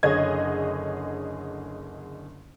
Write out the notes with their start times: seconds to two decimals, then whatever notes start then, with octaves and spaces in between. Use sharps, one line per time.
0.03 F#1 D3 G#4 C#5 D#5 G#6